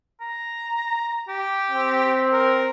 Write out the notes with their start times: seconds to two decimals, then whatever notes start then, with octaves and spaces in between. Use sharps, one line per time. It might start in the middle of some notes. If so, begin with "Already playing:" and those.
0.21 A#5
1.28 G4
1.71 C4
2.32 A#4